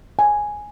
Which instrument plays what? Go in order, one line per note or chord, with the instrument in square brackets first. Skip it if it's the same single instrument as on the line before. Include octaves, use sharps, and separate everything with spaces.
[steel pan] G#5